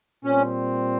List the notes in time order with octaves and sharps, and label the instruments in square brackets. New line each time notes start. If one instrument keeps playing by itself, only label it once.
[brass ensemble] A#2 G3 C4 [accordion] C#4